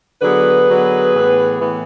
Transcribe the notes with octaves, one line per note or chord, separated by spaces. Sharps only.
D3 F#3 B3 G#4 B4
D3 F#3 B3
A2 E3 B3
A2 E3 B3